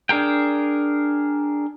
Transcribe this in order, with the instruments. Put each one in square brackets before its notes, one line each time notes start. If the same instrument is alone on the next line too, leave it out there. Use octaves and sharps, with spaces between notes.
[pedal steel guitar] D4 G#4 A#4 G5